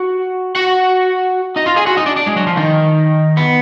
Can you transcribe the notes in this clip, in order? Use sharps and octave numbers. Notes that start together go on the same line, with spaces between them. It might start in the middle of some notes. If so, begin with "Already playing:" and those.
Already playing: F#4 F#5
F#4 F#5
D#4 D#5
F4 F5
G#4 G#5
F#4 F#5
D#4 D#5
D4 D5
D4 D5
G#3 G#4
F#3 F#4
F3 F4
D#3 D#4
B3